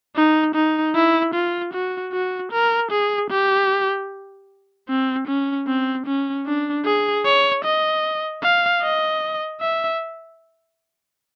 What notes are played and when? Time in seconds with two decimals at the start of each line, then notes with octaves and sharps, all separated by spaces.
0.16 D#4
0.55 D#4
0.95 E4
1.34 F4
1.73 F#4
2.13 F#4
2.52 A#4
2.91 G#4
3.30 G4
4.89 C4
5.27 C#4
5.67 C4
6.06 C#4
6.46 D4
6.85 G#4
7.25 C#5
7.64 D#5
8.43 F5
8.82 D#5
9.61 E5